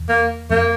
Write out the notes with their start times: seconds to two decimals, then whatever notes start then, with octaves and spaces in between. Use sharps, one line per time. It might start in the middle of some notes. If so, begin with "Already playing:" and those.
Already playing: E2
0.09 A#3
0.50 F2 A#3